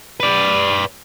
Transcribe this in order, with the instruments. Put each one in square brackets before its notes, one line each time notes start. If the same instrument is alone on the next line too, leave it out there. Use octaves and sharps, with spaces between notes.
[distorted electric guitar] B4 D5